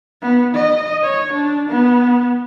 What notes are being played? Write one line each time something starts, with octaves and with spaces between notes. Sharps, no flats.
B3
D#5
C#5
D4
B3